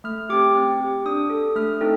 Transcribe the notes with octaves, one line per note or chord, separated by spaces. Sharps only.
A3 F6
C4 G4 D6
C4
G4
D4 D#6
A4
A3 F6
C4 D#4 A4